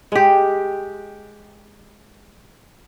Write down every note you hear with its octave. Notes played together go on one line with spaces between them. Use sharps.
G#3 G4